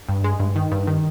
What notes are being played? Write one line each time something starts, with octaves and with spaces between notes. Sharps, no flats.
G2
G#3
G2
D#3
G2
D#3